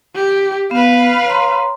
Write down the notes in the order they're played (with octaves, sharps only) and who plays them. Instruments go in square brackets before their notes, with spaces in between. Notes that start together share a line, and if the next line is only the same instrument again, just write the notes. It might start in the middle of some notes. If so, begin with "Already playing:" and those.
[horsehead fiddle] G4
[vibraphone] B3 [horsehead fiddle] B4 F5
[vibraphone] C#5 A#5 C6